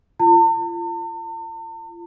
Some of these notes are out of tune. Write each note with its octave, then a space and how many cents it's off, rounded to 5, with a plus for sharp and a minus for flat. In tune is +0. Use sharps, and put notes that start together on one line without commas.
F4 -30 A5 +45